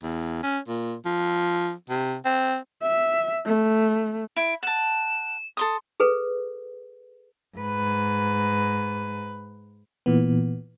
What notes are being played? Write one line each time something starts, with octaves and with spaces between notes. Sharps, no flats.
E2
C#4
A#2
F3
C3
C4
E5
A3
E4 D7
F#5 A5 E7
A4 C6 D#6
G#4 A4 B4
G#2 B4
A#2 E3 B3